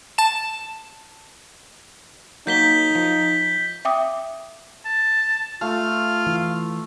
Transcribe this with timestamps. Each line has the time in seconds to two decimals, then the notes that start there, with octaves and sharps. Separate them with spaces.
0.18 A5 E7
2.47 F#3 A#3 D#4 G6 B6 G7
2.95 F3
3.85 E5 G5 D6 D#6
4.85 A5
5.61 A3 F4 F5
6.26 E3